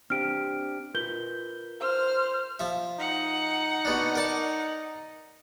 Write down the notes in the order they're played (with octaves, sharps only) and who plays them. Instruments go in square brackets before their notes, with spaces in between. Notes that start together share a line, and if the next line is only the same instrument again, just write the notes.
[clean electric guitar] C4 D4 G4 [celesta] F6 D7
[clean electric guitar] F4 A#4 B4 [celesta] G6 G7
[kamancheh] C5 F6
[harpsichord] F3 E5
[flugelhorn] D#4 [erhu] F#5
[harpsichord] B2 B3 D4
A#4 D5 A5